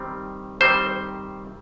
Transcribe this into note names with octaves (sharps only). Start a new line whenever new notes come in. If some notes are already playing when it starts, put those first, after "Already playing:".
Already playing: D#3 G3 C4
D#3 G3 C4 C5